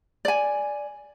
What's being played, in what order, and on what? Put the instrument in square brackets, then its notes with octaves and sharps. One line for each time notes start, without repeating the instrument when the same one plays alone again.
[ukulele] D5 G#5